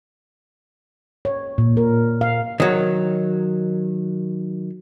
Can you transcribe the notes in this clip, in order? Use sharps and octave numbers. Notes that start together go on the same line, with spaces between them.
C#5
A#2
A#4
F5
D#3 F#3